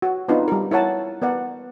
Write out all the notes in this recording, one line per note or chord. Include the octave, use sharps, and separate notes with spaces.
F#4
B3 C4 D4 D#4 F4 B4
G3 A#4
E4 A#4 C#5 F#5 A5
B3 A#4 D5 F#5